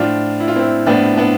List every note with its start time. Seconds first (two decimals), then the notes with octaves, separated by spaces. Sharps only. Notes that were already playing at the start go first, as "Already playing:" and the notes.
Already playing: A2 F3 D4 F4
0.40 E4
0.48 F4
0.56 C4 E4
0.86 A2 F3 B3 D4
1.17 B3 D4